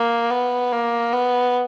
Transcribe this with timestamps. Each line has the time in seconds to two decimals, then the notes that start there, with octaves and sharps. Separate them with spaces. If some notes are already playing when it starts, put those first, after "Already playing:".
Already playing: A#3
0.30 B3
0.72 A#3
1.13 B3